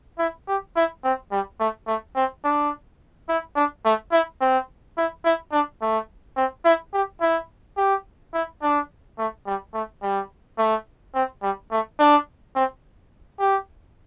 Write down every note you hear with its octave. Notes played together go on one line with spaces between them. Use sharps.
E4
G4
E4
C4
G3
A3
A3
C4
D4
E4
D4
A3
E4
C4
E4
E4
D4
A3
C4
E4
G4
E4
G4
E4
D4
A3
G3
A3
G3
A3
C4
G3
A3
D4
C4
G4